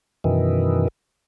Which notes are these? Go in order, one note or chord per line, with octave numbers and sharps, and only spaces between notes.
F#2 B2 D#3 E3